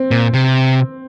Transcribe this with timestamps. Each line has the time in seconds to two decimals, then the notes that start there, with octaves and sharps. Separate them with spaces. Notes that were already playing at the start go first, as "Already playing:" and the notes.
Already playing: C4
0.11 A#2
0.34 C3